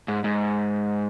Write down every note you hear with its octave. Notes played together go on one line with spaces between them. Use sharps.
G#2
G#2